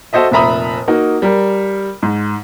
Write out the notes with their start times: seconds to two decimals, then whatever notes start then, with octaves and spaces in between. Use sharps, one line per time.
0.13 F#4 A4 C5 D#5 E5
0.32 F1 A#2 E5 A#5 B5 D#6
0.88 A#3 D#4 F#4
1.22 G3 A#4
2.03 G#2